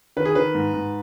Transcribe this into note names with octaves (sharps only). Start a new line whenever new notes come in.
D#3 B4
G#4
D#3 B4
G#2
G#2